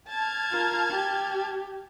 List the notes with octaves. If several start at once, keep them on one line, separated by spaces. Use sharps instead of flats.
A5 F6 G#6
F4 A#4
G4